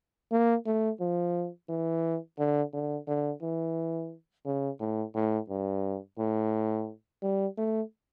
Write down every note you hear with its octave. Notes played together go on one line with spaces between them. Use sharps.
A#3
A3
F3
E3
D3
D3
D3
E3
C#3
A2
A2
G2
A2
G3
A3